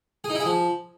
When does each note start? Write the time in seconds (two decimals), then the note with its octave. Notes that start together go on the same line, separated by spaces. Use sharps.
0.24 G#4
0.30 D#4
0.35 E4
0.40 G#4
0.46 F3